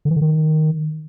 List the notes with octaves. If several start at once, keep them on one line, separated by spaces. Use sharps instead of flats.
D3
E3
D3
D#3